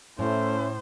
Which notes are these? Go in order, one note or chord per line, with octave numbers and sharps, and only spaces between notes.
A2 A3 C#4 E4 C5